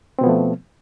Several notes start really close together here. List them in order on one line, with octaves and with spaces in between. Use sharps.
C4 B2 B3 F3 A3